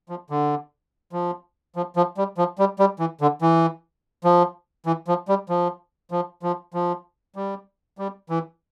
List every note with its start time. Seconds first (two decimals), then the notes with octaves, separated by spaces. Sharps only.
0.09 F3
0.30 D3
1.13 F3
1.76 F3
1.96 F3
2.18 G3
2.38 F3
2.59 G3
2.79 G3
2.99 E3
3.21 D3
3.42 E3
4.24 F3
4.86 E3
5.08 F3
5.28 G3
5.49 F3
6.11 F3
6.43 F3
6.74 F3
7.36 G3
7.98 G3
8.29 E3